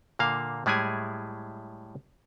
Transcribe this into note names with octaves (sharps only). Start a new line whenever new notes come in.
A#2 D3 A#3 F5
A2 G3 G#3 E4 G#4 G#5